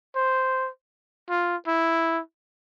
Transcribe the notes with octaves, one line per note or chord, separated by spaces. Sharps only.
C5
F4
E4